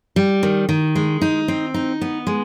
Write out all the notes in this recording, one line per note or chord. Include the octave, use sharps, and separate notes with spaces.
G3
D#3
D#3
G#3
D#4
C4
D#4
B3
G#3